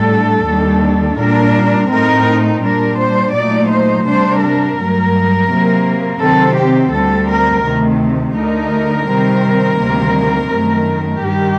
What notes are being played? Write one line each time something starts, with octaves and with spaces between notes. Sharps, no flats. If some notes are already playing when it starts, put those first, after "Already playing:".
Already playing: A2 G3 D4 A4
D#2 D#3 G3 D4
A#2 G3 D4 A#4
A2 A3 C4 D#4 A#4
A#2 G3 D4 A#4
C5
A#2 F#3 A3 D#4 D5
C5
C3 G3 D4 C5
A#4
G2 F#3 A3
C3 F#3 A#3
C3 D#3 F#3 C4 A4
G4
D2 D3 G3 C4 A4
A#4
D2 C3 D#3 A3
D2 D3 A3 D#4 A#4
C3 D#3 G3 C4
D2 C3 D#3 G3 A#3
F#2 D#3 A3
G2 D#3 G3 G4